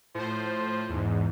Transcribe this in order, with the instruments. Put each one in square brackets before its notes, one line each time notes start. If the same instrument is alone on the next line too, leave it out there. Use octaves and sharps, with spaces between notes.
[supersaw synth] A2 C5 [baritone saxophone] F3
[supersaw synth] E2 G#2